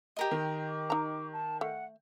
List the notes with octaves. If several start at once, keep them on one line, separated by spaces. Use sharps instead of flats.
G4 A#4 D#5
D#3
D6
D#4 A#5
A5
A3 F#5